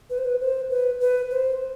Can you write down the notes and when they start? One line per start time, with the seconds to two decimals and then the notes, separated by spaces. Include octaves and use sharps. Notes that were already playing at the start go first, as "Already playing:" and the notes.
0.10 B4
0.18 C5
0.25 B4
0.40 C5
0.70 B4
1.00 B4
1.31 C5